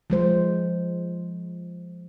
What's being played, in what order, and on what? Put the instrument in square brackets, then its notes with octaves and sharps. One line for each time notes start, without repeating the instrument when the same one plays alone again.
[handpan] F3 G#3 C5